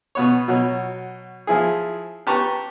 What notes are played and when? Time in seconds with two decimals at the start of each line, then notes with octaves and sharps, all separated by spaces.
0.15 B2 B3 C#5
0.48 B2 F#3
1.47 F3 E4 G#4
2.27 G4 B4 A5 A#5 C#6